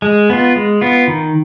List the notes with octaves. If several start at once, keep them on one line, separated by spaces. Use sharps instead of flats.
G#3
B3 F4
G#3
B3 F4
D#3